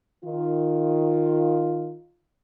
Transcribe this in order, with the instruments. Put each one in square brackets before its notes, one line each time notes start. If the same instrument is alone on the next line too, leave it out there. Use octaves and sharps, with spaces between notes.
[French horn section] D#3 F4